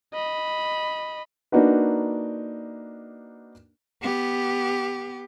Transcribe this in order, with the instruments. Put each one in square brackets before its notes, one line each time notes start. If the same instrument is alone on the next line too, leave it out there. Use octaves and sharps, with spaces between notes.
[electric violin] D#5 B5
[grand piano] A#3 D4 D#4 F#4 B4
[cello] B3 G4